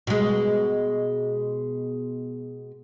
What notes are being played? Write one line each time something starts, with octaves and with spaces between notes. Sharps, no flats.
B2 G#3